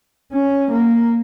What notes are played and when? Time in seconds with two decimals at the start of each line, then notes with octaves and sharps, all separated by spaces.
0.33 C#4
0.71 A#3